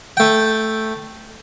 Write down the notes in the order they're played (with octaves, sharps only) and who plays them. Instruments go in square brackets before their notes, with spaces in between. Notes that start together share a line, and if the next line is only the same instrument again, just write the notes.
[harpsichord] A3 G5